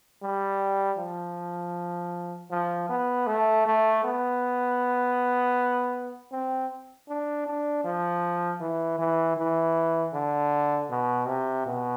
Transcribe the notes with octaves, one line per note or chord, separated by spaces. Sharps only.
G3
F3
F3
B3
A3
A3
B3
C4
D4
D4
F3
E3
E3
E3
D3
B2
C3
B2